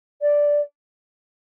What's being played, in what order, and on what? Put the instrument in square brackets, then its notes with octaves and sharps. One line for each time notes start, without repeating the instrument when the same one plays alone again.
[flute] D5